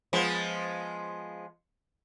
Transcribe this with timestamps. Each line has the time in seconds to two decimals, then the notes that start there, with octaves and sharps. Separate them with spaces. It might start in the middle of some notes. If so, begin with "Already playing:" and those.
0.13 F3 G#3 B3